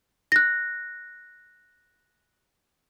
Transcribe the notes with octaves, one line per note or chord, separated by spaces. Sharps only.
F#6 A#6